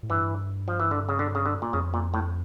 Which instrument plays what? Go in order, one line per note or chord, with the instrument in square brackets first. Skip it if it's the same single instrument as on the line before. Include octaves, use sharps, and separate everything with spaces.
[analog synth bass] A2
[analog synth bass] G2 [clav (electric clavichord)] E3
[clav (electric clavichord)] F3
E3
D3
C#3
D3
C#3
D3
A#2
[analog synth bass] F2 [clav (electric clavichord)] C#3
[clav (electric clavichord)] A#2
A2